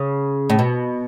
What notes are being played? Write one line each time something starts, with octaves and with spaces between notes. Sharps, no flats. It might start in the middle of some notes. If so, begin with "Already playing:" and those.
Already playing: C#3
A2
B2